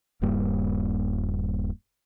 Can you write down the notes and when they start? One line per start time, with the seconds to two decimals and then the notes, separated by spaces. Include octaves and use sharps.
0.22 D#1 G2 G3 A#3